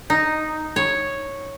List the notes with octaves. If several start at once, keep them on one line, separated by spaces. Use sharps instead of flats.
D#4
C#5